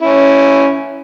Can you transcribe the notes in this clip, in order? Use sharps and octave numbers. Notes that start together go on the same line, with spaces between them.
C#4 E4